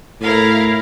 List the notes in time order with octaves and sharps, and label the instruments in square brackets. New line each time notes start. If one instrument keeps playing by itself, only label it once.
[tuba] A2 [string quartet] E4 A#4 F5